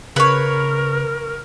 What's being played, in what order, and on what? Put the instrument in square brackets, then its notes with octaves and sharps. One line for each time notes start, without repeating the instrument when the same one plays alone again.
[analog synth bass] C#3 [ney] A#4 [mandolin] B4 C#5